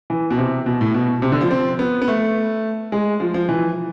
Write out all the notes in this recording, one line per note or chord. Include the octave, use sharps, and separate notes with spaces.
E3
B2
C3
B2
A2
B2
C3
D3
F3
C4
B3
B3
A3
G#3
F3
F3
E3